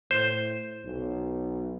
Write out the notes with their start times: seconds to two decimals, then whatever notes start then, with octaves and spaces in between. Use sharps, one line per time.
0.11 A2 C5
0.85 B1